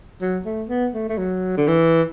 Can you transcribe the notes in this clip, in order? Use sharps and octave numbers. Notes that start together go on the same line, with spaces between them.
F#3
A3
B3
A3
A3
F#3
D3
E3